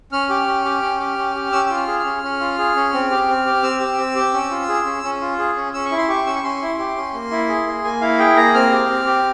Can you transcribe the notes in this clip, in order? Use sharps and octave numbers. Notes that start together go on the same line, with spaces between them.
C#4 F6
G4
C#4
G4
C#4
G4
C#4
G4
C#4 E6
F4 E6
F6
G#4
F6
C#4
C#4
F4
G#4
C#4
C4
G4
C4
G4
C4 E6
G4
C4
G4
C#4
F4
G#4
C#4
C#4
F4
G#4
C#4
C#4 E6
C#6
E4
C6
G4 C#6
C#4 E6
C#6
C#4 C6
E4
G4
C#4
A#3
E4
G#4
A#3
A#3 G#5
E4 F5
G#4 G5
A#3 A#5
C4 F6
G4
C4
G4